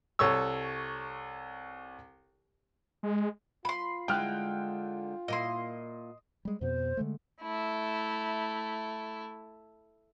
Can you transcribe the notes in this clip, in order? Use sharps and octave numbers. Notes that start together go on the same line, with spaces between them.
C2 A4 C#5 C#6 E6
G#3
F4 B4 B5 C6
D3 G#3 E4 G5 F6 F#6
A#2 A#3 E4 D#5 C6
G3 G#3
F2 B2 B3 C5
D3 G#3 A3
A3 E4